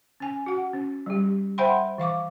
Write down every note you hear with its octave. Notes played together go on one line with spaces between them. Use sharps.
C#4 G#5
F#4 F#5
C#4
G3 G4
C5 E5 F#5 G5 B5 C6
E3 F5 C#6 D6